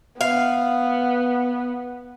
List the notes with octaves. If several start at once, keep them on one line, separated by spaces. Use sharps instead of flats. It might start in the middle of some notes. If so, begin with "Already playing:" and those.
B3 F5